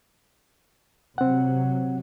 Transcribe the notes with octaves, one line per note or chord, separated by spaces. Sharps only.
C3 F#3 C4 F#5